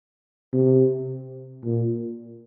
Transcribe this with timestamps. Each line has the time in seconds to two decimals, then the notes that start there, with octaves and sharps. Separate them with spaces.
0.53 C3
1.64 A#2